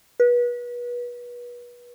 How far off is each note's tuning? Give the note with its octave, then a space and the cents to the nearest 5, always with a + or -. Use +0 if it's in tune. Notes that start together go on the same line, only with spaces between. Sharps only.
B4 -30